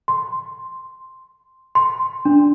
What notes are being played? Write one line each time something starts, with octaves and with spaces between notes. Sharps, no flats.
C6
C6
D4